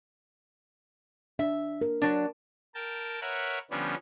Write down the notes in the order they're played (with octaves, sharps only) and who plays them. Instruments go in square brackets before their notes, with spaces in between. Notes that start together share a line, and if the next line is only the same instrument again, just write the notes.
[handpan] D4 [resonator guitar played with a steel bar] E5
[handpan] A#4
[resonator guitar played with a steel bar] F#3 D4
[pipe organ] A#4 G5 A5
A#4 B4 C#5 E5 F#5
D3 F3 G3 B3 C#4 D4